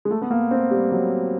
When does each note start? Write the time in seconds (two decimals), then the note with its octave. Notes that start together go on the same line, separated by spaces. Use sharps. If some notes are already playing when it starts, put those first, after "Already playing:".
0.05 G#3
0.11 A3
0.22 B3
0.31 A#3
0.51 C4
0.71 G3
0.91 F#3